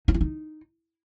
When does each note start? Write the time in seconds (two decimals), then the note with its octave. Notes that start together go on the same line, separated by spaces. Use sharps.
0.08 D#4
0.14 F4
0.21 D#4